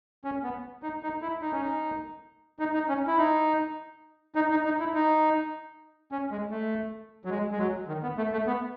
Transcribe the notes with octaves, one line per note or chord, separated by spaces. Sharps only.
C#4
B3
D#4
D#4
E4
D#4
C#4
D#4
D#4
D#4
C#4
E4
D#4
D#4
D#4
D#4
E4
D#4
C#4
G#3
A3
F#3
G#3
G#3
F#3
D#3
B3
A3
A3
B3